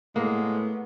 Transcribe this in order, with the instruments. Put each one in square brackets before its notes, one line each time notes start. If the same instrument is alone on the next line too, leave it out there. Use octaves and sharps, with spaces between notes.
[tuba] A2 [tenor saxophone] G#3 [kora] A#3 [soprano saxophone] B3